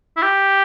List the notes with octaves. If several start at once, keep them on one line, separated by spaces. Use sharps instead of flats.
E4
G4